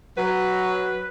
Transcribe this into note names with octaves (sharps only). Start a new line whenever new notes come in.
F#3 B4